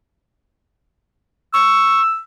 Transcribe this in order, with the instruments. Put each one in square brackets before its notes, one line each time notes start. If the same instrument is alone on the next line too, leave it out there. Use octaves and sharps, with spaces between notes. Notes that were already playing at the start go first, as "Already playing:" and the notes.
[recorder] C#6 [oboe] E6